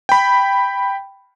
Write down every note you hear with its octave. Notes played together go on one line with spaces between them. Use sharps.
G5 B5